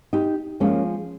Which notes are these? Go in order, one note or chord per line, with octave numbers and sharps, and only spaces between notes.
D#4 G4
F3 G#3 A#3 C#4